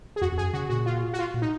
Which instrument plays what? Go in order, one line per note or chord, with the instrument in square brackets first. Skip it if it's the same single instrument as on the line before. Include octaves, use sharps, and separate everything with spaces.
[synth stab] G#4
[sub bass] F2 [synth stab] F#4
[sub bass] F2
[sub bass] F#2 [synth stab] G#4
[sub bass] C#3 [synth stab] F#4
[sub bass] A#2 [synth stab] F#4
[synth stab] F4
F#4
F4
[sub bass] A#2
[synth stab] D#4